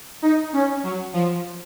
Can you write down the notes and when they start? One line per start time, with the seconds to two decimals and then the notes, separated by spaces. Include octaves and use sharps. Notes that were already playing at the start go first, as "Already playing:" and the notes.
0.22 D#4
0.53 C#4
0.83 F#3
1.13 F3